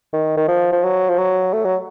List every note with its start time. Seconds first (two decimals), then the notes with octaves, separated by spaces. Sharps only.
0.13 D#3
0.37 D#3
0.48 F3
0.73 F3
0.84 F#3
1.09 F3
1.18 F#3
1.53 A3
1.65 F#3